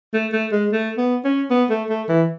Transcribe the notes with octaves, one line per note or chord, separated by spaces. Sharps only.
A3
A3
G#3
A3
B3
C#4
B3
A3
A3
E3